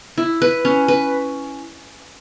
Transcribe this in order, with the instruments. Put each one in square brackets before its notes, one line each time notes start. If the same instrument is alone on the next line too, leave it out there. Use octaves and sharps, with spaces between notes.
[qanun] E4
B4
C#4
B4